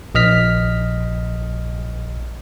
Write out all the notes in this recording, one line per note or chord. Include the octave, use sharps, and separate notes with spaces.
A#1 D#5 F6 B6